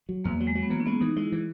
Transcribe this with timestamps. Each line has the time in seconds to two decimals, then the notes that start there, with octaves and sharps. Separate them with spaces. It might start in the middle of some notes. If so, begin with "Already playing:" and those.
0.09 F#3
0.24 E2 A#3
0.40 F#3
0.47 G#3
0.55 F#3
0.63 B3
0.70 E3 A#3
0.80 C#4
0.86 G#3 B3
1.01 E3 D#4
1.16 G#3 E4
1.32 E3